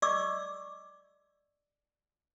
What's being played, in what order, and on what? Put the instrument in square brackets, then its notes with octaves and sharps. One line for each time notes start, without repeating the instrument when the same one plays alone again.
[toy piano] D5 D#5 C#6 D6 E6